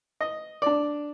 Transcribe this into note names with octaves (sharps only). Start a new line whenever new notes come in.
D#5
D4 D5